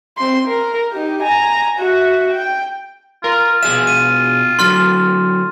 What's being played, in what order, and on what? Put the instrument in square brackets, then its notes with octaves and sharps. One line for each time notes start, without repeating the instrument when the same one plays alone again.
[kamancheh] C4 C6
A#4
D#4 G4
G#5 A#5
F#4 E5
G5
[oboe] F4 [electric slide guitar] A#4
[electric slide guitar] B2 G#4 E5 [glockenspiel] E7
[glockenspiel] D#7
[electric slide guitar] D3 F#3 [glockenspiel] C6 F6 A6